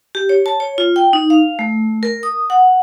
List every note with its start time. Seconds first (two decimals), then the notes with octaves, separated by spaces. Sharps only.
0.15 G4
0.29 C#5
0.46 A5
0.60 C#5
0.78 F4
0.96 G5
1.13 D#4
1.30 F5
1.59 A3
2.03 A#4
2.23 D#6
2.50 F#5